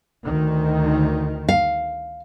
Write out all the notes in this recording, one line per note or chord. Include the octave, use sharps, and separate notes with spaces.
D2 D#3
F5